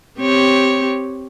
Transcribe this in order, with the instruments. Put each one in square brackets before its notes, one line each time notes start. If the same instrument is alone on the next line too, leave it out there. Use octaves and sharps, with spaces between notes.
[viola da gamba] C4 G4 C#5